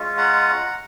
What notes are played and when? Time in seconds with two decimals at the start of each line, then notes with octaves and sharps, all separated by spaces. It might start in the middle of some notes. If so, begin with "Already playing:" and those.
Already playing: G#3 C#4 F4
0.18 F#5 A#5
0.66 A#5